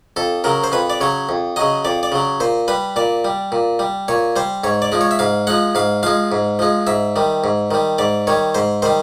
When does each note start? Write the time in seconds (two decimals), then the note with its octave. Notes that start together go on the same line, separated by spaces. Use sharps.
0.16 F2 A4
0.44 C#3 F#3 A#4
0.64 C5
0.72 F2 B4
0.90 D5
1.01 C#3 F#3 C#5
1.29 F2
1.56 C#3 F#3 D#5
1.85 F2 D5
2.03 D5
2.12 C#3 F#3
2.40 A#2 C5
2.68 G3 B4
2.96 A#2 D5
3.25 G3
3.52 A#2
3.79 G3
4.08 A#2 C#5
4.36 G3 C5
4.64 G#2 C#5
4.82 D5
4.92 F3 G#3
5.01 C#5
5.11 E5
5.19 G#2 F5
5.47 F3 G#3 F#5
5.75 G#2 F5
6.03 F3 G#3 F5
6.32 G#2
6.59 F3 G#3
6.87 G#2 E5
7.16 D#3 G3
7.44 G#2
7.71 D#3 G3
7.98 G#2 D5
8.27 D#3 G3 C#5
8.55 G#2 C5
8.82 D#3 G3 C5